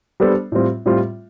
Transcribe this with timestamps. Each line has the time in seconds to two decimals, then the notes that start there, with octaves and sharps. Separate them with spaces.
0.20 G3 B3 D4 A4 C5
0.52 A2 G3 C4 F4
0.86 A2 G3 C4 F4